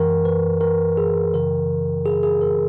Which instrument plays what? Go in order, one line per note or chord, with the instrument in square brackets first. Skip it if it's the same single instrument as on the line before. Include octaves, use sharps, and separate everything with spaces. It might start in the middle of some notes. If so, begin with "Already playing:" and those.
Already playing: [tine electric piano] F#2 E3 A#4
B4
A#4
G#4
F#2 C#3 E3 A#4
G#4
G#4
A#4